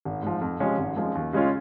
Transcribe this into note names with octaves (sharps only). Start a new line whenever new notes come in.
G#1
G#2 F3
F2
C3 F3 G#3 C#4
G#1
F#2 F3 G#3
D#2
C#3 G#3 C#4 F4